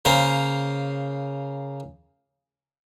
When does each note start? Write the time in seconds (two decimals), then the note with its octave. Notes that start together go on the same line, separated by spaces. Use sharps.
0.05 C#3 A#3 C5